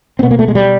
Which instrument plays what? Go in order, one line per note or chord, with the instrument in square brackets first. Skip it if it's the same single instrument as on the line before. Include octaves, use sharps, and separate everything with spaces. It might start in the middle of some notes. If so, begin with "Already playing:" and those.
[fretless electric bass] C4
B2 B3
A#3
A3
G#3
G3